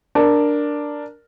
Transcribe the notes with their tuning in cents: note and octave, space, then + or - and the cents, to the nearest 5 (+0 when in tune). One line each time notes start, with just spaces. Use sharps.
D4 +0 A#4 +0